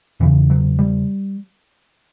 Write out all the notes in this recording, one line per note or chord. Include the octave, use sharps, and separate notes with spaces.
E2 C#3 E3
F#3
G3